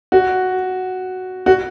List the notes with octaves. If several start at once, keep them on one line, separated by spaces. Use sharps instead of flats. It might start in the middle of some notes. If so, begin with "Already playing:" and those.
F#4
F#4